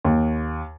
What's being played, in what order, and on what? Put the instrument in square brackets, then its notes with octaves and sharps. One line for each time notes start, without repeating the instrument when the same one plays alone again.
[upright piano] D#2